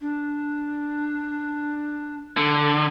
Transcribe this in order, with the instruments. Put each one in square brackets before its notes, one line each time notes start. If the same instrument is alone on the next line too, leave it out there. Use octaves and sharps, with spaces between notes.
[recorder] D4
[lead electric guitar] D3 [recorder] A4